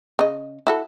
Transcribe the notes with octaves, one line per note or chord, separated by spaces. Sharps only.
C#3 D#5
E4 F#4 A4